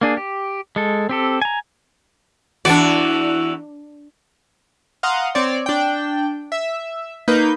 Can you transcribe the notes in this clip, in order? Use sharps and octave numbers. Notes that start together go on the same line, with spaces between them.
A#3 D4 G#4
G4
G#3 A4
C4 G4 A4
G#5 A#5
E2 E3 D4 F#4 D5
F5 F#5 A#5 C6 D#6
C4 C#5 D5
D4 G5
E5
A#3 D#4 B4 G6